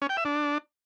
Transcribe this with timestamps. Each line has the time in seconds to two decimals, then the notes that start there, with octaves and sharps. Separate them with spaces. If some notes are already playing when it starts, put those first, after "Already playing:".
0.02 C#4
0.09 G5
0.17 E5
0.25 D4